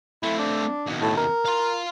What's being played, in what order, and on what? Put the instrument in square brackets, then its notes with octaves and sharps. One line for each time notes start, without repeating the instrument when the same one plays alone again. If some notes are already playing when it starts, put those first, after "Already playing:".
[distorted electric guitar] A3 C4 [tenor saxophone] E4
[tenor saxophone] D4
[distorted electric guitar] D#2 B2
[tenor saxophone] A2
A#4
[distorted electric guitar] F5 C6